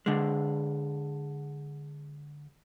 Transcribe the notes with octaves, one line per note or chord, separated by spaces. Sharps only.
D3 G#3